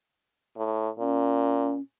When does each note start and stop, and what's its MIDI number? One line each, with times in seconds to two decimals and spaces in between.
0.57 0.89 45
0.99 1.73 46
0.99 1.80 61